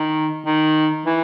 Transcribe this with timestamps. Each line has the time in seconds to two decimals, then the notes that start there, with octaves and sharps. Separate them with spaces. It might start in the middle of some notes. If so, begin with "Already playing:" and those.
Already playing: D#3
0.46 D#3
1.06 E3